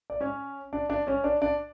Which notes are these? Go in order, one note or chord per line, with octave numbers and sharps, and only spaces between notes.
D5
C#4 C#5
D4 D5
D4 D5
C#4 C#5
D4 D5
D4 D5